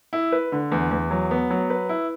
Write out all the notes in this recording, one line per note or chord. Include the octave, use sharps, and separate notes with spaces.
E4
B4
D3
E2
E2
F#3
B3
F#3
B4
E4